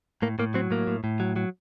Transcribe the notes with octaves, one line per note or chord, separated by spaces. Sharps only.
A2 A#3
A2 A#3
F#3 C4
A2 A#3
A2
A2
F#3
F#3